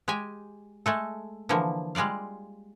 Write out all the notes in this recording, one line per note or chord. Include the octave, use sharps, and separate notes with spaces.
G#3 G4 G5 G#5
G#3 A3 A4
D3 E3 F3 A#3
G3 G#3 F4 D5 F5